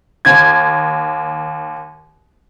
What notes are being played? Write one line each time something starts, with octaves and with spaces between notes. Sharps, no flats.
D#2 G#6